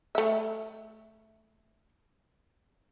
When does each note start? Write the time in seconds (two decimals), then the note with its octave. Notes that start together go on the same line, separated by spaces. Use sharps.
0.15 A3 E5